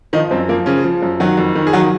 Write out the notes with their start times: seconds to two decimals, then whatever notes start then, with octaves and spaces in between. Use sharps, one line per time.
0.13 D#3 F3 D#4
0.31 F#2 C4
0.49 F3 A#3
0.66 C#3 F3 C#4
0.84 F3
1.02 F#2
1.20 D#3 F#3 F#4
1.37 F2
1.55 D#3
1.67 G#4
1.73 D#3 F#3 F#4